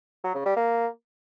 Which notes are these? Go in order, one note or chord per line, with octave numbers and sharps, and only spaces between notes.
F#3
C#3
G3
A#3